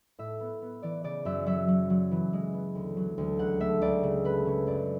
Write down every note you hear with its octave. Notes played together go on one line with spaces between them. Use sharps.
A2 E5
B3
B3
E3 D5
C#3 D5
F#2 E5
F#3 E5
F#3
F#3
E3
G#3
B3
D2
F#3
D2
C#2 F#5
A3 E5
C#2 D5
C#3
A3 B4
C#3 C#5
F#2 D5